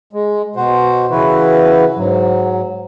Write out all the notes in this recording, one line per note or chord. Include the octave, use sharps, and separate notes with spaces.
G#3
B2 F#4 C5
C#3 E3 E4 F#4 B4
G#2 F#3